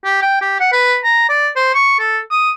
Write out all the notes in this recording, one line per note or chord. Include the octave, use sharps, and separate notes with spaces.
G4
G5
G4
F#5
B4
A#5
D5
C5
C#6
A4
D#6